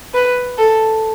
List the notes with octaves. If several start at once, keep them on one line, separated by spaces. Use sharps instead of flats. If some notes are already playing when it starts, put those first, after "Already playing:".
B4
A4